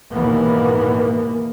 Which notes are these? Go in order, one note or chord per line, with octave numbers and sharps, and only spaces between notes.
D#2 G#2 B2 E3 A#3 B3